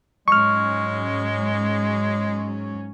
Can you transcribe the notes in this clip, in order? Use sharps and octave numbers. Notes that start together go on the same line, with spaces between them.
G#2 F#3 G#3 C#4 C#6 F6